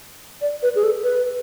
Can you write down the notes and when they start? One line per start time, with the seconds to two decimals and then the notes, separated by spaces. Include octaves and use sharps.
0.41 D5
0.63 B4
0.76 G#4
0.84 A4
1.03 B4